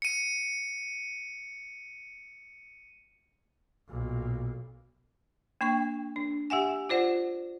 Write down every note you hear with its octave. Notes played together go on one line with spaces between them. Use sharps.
C#7 D#7
B1 A#2
A#3 D4 G5 C#6
D4
G4 E5 F#5 G#5
F4 C5 D5 F#5